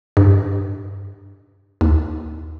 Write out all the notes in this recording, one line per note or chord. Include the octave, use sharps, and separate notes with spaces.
G2
D#2